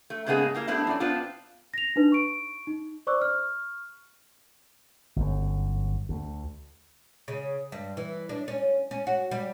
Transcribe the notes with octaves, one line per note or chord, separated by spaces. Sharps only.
A3
G#2 C#3 A#3 B3 G#4
G3 A#3 E4
G3 A3 B3 C4 D4 E4
F#2 F4 D5
B3 C4 D4 F4
A#6 F7
D4 D#4 B4
C#6 D7
D#4
C5 D5 C#6 D6 E6 F#6
C#6 F6
G1 F#2
D2
C#3
G2
E3
D4
C#4
C#4
F#4
G3